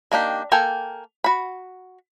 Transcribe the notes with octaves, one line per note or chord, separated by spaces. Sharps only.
D#3 A#3 D4 G4
A#3 A4 A#4 G5 G#5
F#4 B5